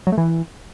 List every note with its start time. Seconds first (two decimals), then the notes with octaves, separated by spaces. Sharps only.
0.07 F#3
0.12 A3
0.18 E3